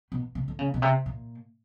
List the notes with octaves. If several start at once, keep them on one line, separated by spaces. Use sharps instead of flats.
B2
C3
D3
C#3
B2
C3
A#2